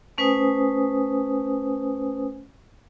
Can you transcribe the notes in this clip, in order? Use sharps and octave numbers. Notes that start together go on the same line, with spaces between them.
A3 C#4 B4 C5 G#5 D#6